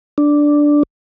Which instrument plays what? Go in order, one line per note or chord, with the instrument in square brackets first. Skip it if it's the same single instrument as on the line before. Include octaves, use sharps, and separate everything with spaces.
[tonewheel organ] D4